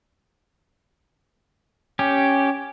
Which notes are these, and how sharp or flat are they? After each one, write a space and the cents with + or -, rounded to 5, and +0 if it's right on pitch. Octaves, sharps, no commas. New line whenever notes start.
C#4 +0 G4 +0